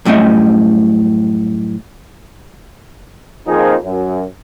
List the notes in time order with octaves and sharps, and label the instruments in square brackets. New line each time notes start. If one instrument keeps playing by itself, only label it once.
[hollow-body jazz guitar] F#2 A2 G3 C#4 D#5 E5
[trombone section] F2 F3 A#3 D#4 G#4
F#2